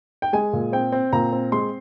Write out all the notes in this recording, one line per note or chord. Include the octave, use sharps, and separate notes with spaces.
G5
G#3 G#5
A#2
C4 G5
C4
A#2 A#5
C4
G#3 C6